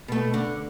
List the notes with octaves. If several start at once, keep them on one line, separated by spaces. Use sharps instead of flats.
B2 A3
D3